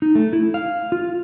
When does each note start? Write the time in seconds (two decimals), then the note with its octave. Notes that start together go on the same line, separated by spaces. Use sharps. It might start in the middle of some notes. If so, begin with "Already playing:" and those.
0.02 D#4
0.15 A3
0.33 E4
0.54 F5
0.92 F4